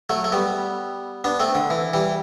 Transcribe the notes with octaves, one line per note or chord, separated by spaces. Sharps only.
F#3 A3
A3
G3 B3
B3 D4
A3 C4
D3
E3
E3 G3